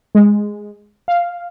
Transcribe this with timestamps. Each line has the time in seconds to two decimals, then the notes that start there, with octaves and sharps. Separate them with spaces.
0.15 G#3
1.08 F5